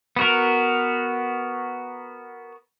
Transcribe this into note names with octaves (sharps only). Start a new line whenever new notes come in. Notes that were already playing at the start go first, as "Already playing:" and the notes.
B3 F#4 A#4